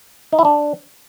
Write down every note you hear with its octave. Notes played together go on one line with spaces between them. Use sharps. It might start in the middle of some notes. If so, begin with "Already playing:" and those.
D#4
E4
D4